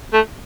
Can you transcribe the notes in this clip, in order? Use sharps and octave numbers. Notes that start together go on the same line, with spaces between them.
A3